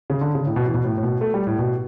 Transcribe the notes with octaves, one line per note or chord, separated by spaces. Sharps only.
C#3
D3
C#3
A2
B2
E3
B2
A2
A2
B2
A3
G3
A2
B2